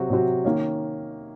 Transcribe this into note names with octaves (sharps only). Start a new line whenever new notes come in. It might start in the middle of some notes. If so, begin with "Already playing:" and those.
Already playing: C3 F#3 C4 F#4
C3 F#3 C4 F#4
D#3 A#3 C#4